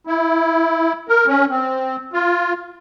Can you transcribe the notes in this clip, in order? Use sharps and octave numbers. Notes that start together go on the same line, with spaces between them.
E4
A#4
C#4
C4
F4